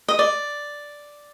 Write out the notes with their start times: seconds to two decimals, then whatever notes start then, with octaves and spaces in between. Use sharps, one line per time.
0.08 D#5
0.19 D5